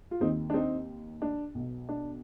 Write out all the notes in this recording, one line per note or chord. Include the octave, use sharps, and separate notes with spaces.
F4
D#2 D#3 C4 D#4
D4
C4 D#4
D4
B1 B2
D4